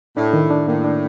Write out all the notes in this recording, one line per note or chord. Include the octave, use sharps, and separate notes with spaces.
A2 D4
D#3
D4
A2 A#3
D4